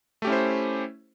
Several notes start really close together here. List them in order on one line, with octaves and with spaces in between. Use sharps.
A3 G4 C#4 E4 C5